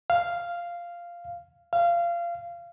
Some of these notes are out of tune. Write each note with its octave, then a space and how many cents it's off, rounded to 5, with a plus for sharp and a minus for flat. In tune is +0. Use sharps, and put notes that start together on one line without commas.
F5 -5
F5 -20